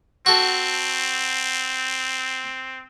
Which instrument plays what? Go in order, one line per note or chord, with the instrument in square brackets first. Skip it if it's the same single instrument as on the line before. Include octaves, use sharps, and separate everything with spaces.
[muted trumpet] C4 [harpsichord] F#4 A4